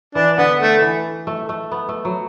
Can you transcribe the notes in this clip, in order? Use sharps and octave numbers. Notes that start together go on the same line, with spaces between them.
E3 D4
D3 B3
A3
E3
A3
A3
B3
A3
F#3